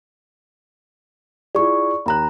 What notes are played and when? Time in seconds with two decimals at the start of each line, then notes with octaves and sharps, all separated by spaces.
1.55 E4 F4 G#4 D5 C#6
2.06 D#2 A#5 B5 F#6